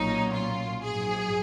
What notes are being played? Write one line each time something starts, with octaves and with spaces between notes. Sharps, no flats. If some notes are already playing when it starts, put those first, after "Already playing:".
Already playing: B1 A#2 F#3 C#4 D#4
F4
A#1 G#2 F#3 G#4